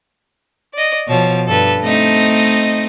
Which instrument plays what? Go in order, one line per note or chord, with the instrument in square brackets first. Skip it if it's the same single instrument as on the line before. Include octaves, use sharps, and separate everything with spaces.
[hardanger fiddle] D5 D#5
[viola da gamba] B2 F3 [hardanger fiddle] C#5 A5
[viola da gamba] G2 [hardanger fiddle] A4 B4
[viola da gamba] A3 C4 D#4 [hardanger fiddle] D#5